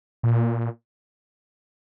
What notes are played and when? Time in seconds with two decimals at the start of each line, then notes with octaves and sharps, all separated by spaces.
0.23 A#2